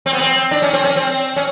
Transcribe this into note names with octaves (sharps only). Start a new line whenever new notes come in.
C4
B3
C4
D4
C#4
C4
C#4
C4
C#4